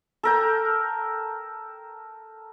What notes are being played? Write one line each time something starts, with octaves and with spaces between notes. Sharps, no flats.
A4 A#4 G5